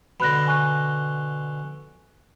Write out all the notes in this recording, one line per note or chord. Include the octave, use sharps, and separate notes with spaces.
B2 D3 B5 F#6 A#6
G#5 C#6 F#6